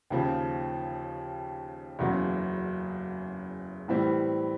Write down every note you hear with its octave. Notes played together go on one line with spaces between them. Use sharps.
D#2 C#3 F3
F#1 E2 C#3 F#3
A2 E3 G3 C4 E4